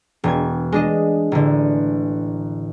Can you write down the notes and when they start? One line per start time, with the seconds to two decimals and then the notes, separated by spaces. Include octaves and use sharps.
0.24 E1 G#6
0.72 G#3 D4 D#5
1.32 A1 D3